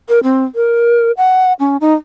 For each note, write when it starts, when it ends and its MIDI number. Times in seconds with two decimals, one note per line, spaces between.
0.09 0.19 70
0.23 0.44 60
0.55 1.12 70
1.17 1.53 78
1.60 1.77 61
1.81 1.94 63